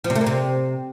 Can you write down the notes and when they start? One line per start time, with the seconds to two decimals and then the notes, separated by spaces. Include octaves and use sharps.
0.04 F3
0.10 C3
0.15 A3
0.21 A#3
0.27 C3